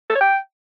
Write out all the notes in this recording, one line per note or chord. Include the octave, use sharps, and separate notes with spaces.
A4
C#5
G5